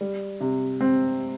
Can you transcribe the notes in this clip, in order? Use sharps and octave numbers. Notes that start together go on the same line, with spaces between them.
G3
C3
C4